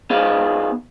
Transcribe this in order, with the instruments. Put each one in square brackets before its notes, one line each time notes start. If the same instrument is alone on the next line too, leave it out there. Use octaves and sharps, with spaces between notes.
[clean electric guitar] B3 D#4 G#4 C5 F5